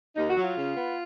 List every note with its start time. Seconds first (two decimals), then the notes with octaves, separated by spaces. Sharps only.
0.16 D#2 D#4
0.30 F#4
0.37 F#3
0.43 F4
0.56 C#3
0.76 B3